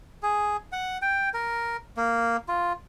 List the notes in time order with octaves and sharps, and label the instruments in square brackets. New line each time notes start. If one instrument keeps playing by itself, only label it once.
[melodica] G#4
F#5
G5
A#4
A#3
F4